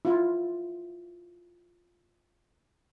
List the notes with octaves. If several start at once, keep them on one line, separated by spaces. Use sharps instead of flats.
E4 F4